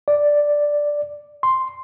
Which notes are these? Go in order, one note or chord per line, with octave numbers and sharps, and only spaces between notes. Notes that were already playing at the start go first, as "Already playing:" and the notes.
D5
C6